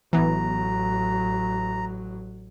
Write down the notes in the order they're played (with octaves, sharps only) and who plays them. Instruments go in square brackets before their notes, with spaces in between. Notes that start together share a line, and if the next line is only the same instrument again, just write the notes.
[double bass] A1 F#3 [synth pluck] E3 B3 [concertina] A#5